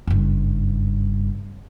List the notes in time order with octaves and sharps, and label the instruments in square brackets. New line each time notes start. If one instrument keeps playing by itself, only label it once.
[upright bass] F#1 G2